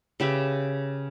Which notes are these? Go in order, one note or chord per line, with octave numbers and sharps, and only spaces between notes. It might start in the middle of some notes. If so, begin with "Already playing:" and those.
C#3 G4 B4 E5